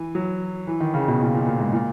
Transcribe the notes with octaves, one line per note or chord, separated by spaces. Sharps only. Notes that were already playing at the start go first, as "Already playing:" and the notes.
Already playing: E3
F#3
E3
D#3
C#3
B2
A#2
A#2
A#2
G#2
A#2